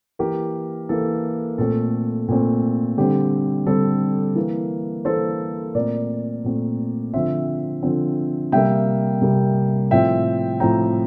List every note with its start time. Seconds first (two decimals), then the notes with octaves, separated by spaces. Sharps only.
0.19 E3 A#3 G4 A#4
0.89 E3 A#3 A4
1.58 A#2 A3 C4 A4
2.28 A#2 A3 C4
2.98 D3 G3 C4 G4
3.66 D3 G3 C4 A4
4.35 E3 A#3
5.05 E3 A#3 A4 C5
5.75 A#2 A3 C4 A#4 D5
6.44 A#2 A3 C4
7.14 D3 F3 C4 C5 E5
7.83 D3 F3 C4
8.52 C3 G3 A#3 E5 G5
9.22 C3 G3 A#3
9.91 A2 F3 C4 E5 G5
10.60 A2 F3 C4 G5 A#5